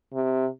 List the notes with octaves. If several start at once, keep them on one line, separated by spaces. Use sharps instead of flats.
C3